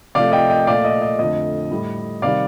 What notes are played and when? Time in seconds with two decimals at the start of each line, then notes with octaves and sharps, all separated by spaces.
0.15 C3 F3 A3 D5 F5
0.32 D#5 G5
0.50 D#5 G5
0.67 A#2 A3 D5 F5
0.85 D#5
1.02 D#5
1.19 F2 D3 A3 D#5
1.71 A2 G3
2.22 C3 D#3 G3 D5 F5